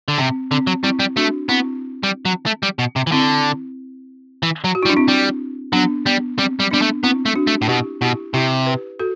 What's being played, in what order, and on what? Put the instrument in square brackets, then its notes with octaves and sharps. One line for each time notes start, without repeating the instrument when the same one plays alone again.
[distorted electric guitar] D3
[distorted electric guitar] C3 [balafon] C4
[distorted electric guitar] D3 [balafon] C4
[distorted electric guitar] F#3
[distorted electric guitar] G3 [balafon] C4 E4
[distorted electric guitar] G3
[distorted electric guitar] A3 [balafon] D4 F#4
[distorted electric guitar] B3 [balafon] C4 E4
[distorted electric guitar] G3
F#3
A3
G3
B2
C3
E3
[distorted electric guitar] D3 [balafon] C4 E4
[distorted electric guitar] E3
F#3
[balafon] F#4
E4
[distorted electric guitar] G3
[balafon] D4
C4 E4
[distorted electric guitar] G3
[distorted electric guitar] F#3 [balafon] B3 D4
[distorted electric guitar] G3 [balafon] B3
[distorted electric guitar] G3 [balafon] C4
[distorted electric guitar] G3
[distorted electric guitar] G3 [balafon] B3 D4
[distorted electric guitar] A3
[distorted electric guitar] B3 [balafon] C4 E4
[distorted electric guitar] A3
[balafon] D4 F#4
[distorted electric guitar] A3
A2
[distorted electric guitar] B2 [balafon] E4 G4
[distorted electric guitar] B2 [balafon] E4 G4
[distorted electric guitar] C3 [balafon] E4 G4
[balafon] G4 B4
F#4 A4